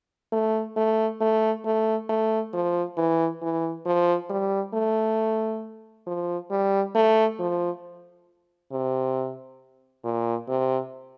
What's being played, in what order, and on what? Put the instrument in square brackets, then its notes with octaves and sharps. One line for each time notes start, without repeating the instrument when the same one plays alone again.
[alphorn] A3
A3
A3
A3
A3
F3
E3
E3
F3
G3
A3
F3
G3
A3
F3
C3
A#2
C3